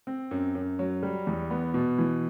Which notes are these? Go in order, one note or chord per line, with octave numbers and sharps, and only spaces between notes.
C4
F#2
F#2
F#3
G3
E2
B3
B2
E3